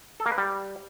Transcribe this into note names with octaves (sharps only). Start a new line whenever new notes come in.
A4
A#3
B4
G3